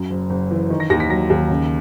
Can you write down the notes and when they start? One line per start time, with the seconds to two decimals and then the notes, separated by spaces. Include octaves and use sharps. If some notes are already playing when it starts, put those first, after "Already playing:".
Already playing: F#2
0.10 F#1
0.30 F#1
0.51 E3
0.70 D#3
0.80 A#6
0.90 D#2 A#6
1.00 B6
1.10 F#3 A#6
1.30 D#2
1.50 C#3